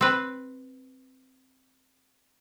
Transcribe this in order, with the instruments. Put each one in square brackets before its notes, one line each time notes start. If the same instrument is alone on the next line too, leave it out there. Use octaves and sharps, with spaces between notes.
[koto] C4 B4